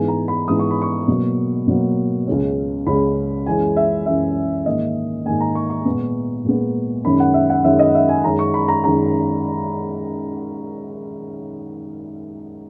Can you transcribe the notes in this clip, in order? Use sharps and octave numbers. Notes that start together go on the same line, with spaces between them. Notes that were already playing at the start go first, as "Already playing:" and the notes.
Already playing: G#2 E3 G#3 B3 G#5
A#5
B5
G#2 E3 G#3 B3 D#6
C#6
B5
C#6
B2 F#3 A#3
B2 F#3 A#3
C#2 C#3 G#3 C#4
C#2 C#3 G#3 C#4 B5
F#2 E3 G#3 C#4 G#5
E5
F#2 E3 G#3 C#4 E5
G#2 D#3 A#3 D#5
G#2 D#3 A#3 G#5
A#5
C#6
C#6
A#2 G#3 B3
A#2 G#3 B3
F#2 D#3 G#3 C#4 B5
F#5
E5
F#5
F#2 D#3 G#3 C#4 E5
D#5
E5
G#5
F#2 D#3 G#3 C#4 A#5
C#6
B5
A#5
F#2 D#3 G#3 C#4 A#5